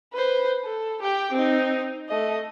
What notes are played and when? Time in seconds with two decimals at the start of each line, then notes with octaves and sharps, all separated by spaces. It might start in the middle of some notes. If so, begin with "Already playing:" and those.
0.13 B4 C5
0.65 A4
1.02 G4 G5
1.32 C4 D#4
2.09 A3 D#5